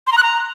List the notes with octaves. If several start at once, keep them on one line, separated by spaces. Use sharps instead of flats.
C6
A#5
F#6
A#5